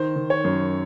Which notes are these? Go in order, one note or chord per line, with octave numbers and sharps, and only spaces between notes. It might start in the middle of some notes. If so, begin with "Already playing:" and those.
Already playing: D#3 C5
D#3
C#5
F#2